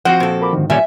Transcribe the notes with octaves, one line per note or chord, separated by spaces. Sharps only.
F3 C4 F#4 C5 F#5
A#2 A4
A#4 B5 D6
G#2 D3 D#3
A#2 G3 C#4 E5 G#5